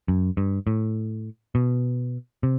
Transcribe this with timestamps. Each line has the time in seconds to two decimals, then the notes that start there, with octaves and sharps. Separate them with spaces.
0.08 F#2
0.37 G2
0.67 A2
1.55 B2
2.43 C3